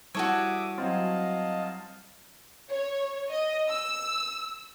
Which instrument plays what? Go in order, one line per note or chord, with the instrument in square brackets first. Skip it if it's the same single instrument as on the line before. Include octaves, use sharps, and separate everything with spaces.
[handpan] G3 E4 [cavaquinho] F#4 A4 C#5 [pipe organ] E5 D6 D#6
[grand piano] F#3 C4 [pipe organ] D#5 F5 A5
[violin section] C#5
D#5
E6